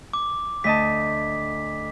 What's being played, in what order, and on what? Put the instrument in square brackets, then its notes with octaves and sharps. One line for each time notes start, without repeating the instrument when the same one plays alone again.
[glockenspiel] D6
[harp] D2 D#5 A5 [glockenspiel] B6